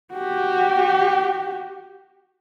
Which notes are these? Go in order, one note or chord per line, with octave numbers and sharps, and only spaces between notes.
F#4 G4